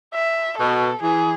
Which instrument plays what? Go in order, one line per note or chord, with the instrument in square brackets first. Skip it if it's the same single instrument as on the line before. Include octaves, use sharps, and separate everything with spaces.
[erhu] E5
[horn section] B2 [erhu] A4
[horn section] E3 [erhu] G#4